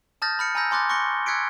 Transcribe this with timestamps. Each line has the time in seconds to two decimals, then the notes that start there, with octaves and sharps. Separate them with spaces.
0.22 A5 D#6 F6 G6 A6 A#6
0.39 B5 F6 C#7
0.55 G#5 A#5 B5 E6 G6 A#6
0.71 G#5 C6 D6 F#6 A6
0.89 C6 C#6 F#6 A#6 C#7 G7
1.26 E6 F#6 G#6 B6 C#7 D7